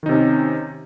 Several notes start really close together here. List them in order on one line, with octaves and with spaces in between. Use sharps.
D#3 D#4 C3 C#4